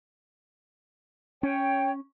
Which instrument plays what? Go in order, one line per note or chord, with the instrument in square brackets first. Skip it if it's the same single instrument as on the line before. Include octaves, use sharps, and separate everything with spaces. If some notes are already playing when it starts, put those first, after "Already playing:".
[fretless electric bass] C#4 [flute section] C#5 G5